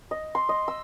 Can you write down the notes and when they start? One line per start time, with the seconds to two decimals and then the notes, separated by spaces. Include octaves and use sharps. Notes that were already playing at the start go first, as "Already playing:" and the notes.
0.11 D#5
0.35 C6
0.49 D#5
0.68 E6